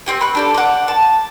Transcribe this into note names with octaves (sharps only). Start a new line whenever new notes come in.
C4 G4 G#5
B5 C#6 F#6
D4 G4 A4
F#5 D6
A5